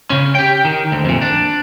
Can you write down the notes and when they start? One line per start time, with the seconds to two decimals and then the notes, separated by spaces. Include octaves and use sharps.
0.10 C#3 C#4
0.35 G4 G5
0.65 D#3
0.92 D2
1.05 F2 A#2
1.21 D4